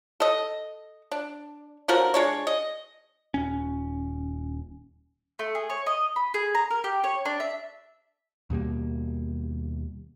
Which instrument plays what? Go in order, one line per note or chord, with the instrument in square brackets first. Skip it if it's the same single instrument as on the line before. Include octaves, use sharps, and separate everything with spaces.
[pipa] A4 D#5
D4
D3 F3 F#3 A#4
G#3 D4 C#5
D#5
[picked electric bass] D#1 C#4
[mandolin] A3
G#4
C#5
D#5
B5
G#4
A#5
A#4
G4
C#5
D4
E5
[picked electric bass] D#2 B2 G3 A#3